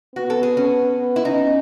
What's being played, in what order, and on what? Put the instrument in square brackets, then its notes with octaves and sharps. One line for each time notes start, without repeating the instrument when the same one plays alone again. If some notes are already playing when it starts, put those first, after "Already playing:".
[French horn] B3 [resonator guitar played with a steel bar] F#4
[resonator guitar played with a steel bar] A4
G#4
C#4
E4
[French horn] C#4 [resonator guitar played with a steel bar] D#4